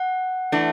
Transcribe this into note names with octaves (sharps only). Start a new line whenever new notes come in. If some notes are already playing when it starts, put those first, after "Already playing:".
Already playing: F#5
E3 A3 D4